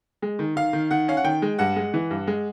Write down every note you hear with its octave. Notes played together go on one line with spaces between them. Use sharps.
G#3
D#3
D#3 F5
D#3
D#3 F#5
C#4 F5
F#5
D#3 G5
G#3
G2 F#5
G#3
E3
G2
G#3